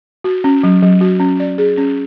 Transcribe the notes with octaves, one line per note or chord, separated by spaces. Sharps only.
F#4
C#4
F#3
F#3
F#4
C#4
D5
G#4
C#4